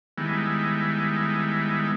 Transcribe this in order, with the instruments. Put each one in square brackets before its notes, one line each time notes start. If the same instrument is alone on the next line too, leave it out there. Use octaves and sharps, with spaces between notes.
[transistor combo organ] D#3 G3 G#3 B3 E4